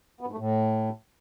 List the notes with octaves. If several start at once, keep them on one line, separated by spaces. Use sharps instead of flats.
B3
G#2
A3
A2